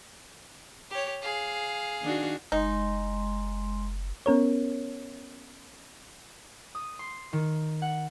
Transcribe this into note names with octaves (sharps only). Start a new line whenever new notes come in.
G4 C#5
G#4 F5
D#3 D4 F#4
F#1 G#3 D#4 C6
B3 C#4 A#4 C#5
D#6
C6
D#3
F#5